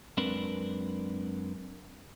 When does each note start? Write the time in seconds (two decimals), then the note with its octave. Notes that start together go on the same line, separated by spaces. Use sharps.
0.17 F#2 G#3 C4 D4 A#4 B4